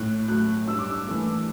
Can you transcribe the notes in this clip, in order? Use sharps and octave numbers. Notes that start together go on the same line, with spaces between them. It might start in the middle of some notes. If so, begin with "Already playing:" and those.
Already playing: A2 F#6
F#3 A3 F#6
G2 E6
D6
E6
E3 A3